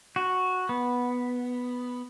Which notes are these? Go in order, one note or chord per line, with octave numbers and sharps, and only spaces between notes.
F#4
B3